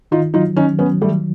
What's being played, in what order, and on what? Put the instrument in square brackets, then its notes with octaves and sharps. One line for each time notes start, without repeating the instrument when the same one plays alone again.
[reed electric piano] D#3 [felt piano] D#4 F4
[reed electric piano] F#3 [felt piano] D#4 F4
[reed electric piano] D#3 [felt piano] C#4 D#4
[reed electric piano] F#3 [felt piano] B3 C#4
[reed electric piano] D#3 [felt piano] G3 A3